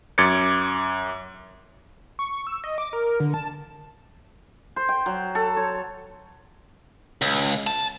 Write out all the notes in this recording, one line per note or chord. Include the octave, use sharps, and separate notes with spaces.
F#2 D6 G#6 A6 C#7
C#6
E6
D#5
D6
A#4
D3
A5
C5
G5
F#3
A4
C#5
C#2
A5